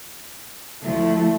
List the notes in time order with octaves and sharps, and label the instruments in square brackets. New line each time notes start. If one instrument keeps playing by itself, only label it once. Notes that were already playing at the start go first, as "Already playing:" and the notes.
[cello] D2 F3 [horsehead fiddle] A3 E4